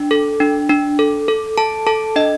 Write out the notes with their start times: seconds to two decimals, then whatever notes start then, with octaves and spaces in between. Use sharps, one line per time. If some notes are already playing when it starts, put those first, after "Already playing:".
Already playing: D4
0.11 A4
0.40 D4
0.69 D4
0.99 A4
1.28 A4
1.57 A4 A5
1.87 A4 A5
2.16 D4 D#5